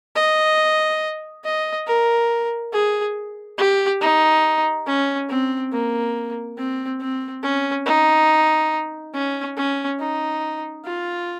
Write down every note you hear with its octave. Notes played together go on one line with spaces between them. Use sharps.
D#5
D#5
A#4
G#4
G4
D#4
C#4
C4
A#3
C4
C4
C#4
D#4
C#4
C#4
D#4
F4